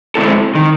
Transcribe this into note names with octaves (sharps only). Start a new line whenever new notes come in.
G#3 C4 E4 A4
D#3